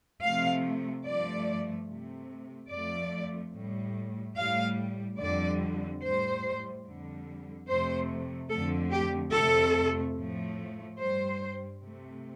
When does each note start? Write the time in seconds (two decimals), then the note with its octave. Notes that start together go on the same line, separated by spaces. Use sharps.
0.22 C3 F3 A3 F5
1.05 G2 F3 A3 D5
1.88 C3 A3
2.71 F2 F3 A3 D5
3.54 A2 G3
4.36 A2 G3 F5
5.18 F2 D3 G3 D5
6.02 A2 G3 C5
6.84 F2 D3 G3
7.68 F2 C3 A3 C5
8.50 F2 D3 F3 A3 A4
8.91 G4
9.32 F2 C3 A3 A4
10.16 A2 F3 A3
10.98 G2 G3 C5
11.81 C3 A3